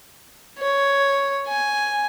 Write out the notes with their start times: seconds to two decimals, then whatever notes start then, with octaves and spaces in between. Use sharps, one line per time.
0.59 C#5
1.48 G#5